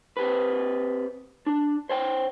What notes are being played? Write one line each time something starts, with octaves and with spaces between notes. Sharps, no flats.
C4 G4 B4
D4
C5 C#5 G5